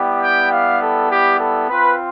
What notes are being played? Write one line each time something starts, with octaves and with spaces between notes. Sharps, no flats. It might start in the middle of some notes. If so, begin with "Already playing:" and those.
Already playing: G3 B3 E4 G4
G5
F5
A4
G4
A4
C4 F4 B4